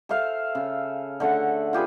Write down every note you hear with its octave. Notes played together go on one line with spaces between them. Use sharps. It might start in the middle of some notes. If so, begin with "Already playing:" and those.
A4 C5 E5 F5
C#3
D3 A3 A4 F#5
F4 G4 G#4 B4